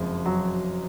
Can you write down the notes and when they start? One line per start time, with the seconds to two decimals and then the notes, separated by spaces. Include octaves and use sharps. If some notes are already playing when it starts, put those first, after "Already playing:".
Already playing: F#1 F2 G#3
0.26 F#3